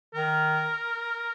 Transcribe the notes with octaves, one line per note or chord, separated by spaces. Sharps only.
D#3 A#4